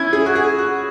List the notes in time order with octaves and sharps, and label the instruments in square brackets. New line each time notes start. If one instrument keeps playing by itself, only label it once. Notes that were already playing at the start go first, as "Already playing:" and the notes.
Already playing: [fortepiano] C#4 E4 [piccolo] G#6
[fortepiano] G#4
F#4
G#4
F#4